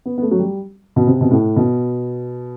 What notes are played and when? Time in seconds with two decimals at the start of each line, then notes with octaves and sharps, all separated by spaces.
0.06 B3
0.18 B3
0.22 A3
0.31 F#3
0.39 G3
0.96 B2
1.07 C3
1.21 B2
1.31 A2
1.56 B2